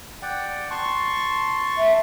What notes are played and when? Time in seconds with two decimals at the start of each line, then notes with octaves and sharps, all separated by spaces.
0.22 D5 F#5 G5
0.71 A5 C6 C#6
1.78 E5